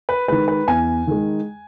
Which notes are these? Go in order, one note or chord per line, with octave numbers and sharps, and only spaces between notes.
B4
D#3 G#3 B4
B4
E2 G#5
D#3 G#3